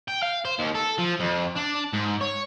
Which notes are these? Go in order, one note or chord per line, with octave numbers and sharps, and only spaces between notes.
G5
F5
C5
D#2
A4
F3
F2
D4
G#2
C#5